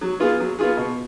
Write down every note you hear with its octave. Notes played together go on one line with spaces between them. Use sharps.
F#3
B3 F4 G#4
F#3
B3 F4 G#4
B2